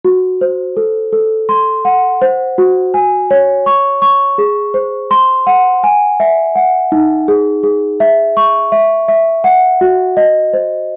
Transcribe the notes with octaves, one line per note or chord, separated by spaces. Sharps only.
F#4
C5
A4
A4
C6
F#5
C5
F#4
G#5
C#5
C#6
C#6
G#4
C5
C6
F#5
G#5
E5
F#5
D#4
G#4
G#4
E5
C#6
E5
E5
F#5
F#4
D#5
C5